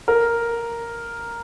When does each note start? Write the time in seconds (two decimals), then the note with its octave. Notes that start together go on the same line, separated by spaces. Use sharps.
0.08 A#4